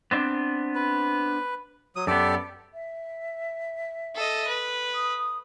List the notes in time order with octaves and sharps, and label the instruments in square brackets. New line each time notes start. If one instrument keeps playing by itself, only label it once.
[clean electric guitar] B3 C4 D4
[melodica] B4
F#3 D#6
[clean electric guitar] F#2 B3 [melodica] G4 A4 D5
[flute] E5
[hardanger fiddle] A4 D#5
B4
[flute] D#6